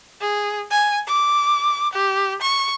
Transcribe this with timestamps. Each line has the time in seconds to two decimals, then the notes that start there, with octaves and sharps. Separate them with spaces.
0.21 G#4
0.71 G#5
1.08 D6
1.93 G4
2.41 C#6